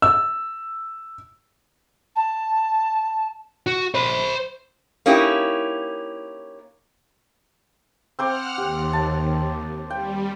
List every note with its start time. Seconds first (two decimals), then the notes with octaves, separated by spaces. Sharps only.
0.02 E6
2.15 A5
3.67 F#4
3.94 C5 B5
5.06 A#3 C#4 D#4 E4 G4
8.19 C4 C5 F#5 D6 F6
8.58 D#2 G4
8.93 A5
9.90 G3 G5